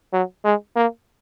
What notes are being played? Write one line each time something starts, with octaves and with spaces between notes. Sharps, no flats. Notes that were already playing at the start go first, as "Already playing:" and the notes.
F#3
G#3
A#3